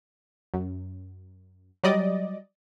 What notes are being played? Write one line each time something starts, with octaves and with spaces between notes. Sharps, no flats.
F#2
F#3 G3 D5 D#5